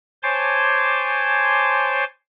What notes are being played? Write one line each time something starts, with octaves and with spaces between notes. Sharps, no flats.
C5 C#5 G#5 A5 C6 D6